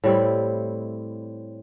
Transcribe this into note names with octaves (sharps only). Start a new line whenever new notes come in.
A2 G3 C4 E4